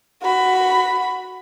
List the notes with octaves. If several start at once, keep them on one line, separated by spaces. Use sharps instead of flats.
F#4 B5